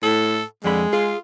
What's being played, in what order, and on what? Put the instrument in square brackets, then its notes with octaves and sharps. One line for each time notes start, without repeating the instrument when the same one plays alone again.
[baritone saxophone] A2 [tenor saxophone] A4
[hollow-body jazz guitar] F2 B5 [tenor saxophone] D3 [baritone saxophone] G#3
[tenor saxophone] F4 [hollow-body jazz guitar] G#4